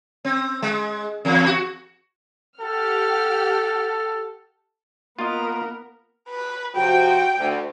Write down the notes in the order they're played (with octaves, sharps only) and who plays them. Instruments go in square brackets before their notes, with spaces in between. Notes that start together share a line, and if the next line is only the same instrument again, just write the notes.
[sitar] C4
G#3
E2
F#4
[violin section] G4 F#5 F6 [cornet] A4
[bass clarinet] A#3 [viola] B3 A#4 [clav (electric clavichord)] F4 D#5
[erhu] B4
[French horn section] C3 F3 F#4 [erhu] G5
[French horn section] D2